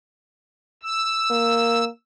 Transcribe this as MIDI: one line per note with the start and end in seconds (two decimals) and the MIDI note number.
0.83 1.84 88
1.31 1.88 58